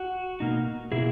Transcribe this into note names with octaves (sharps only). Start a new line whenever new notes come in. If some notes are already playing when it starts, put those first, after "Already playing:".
Already playing: F#4
B2 A#3 D#4
B2 A#3 E4 G#4